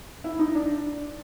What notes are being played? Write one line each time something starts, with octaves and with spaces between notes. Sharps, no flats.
E4
D#4
D4